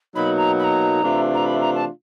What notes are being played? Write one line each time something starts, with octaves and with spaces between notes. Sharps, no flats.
B2 F#3 A#3 D#4 B5
A#5
B5
A#5
C3 E3 A3 D4 F4
A#5
B5
A#5
A5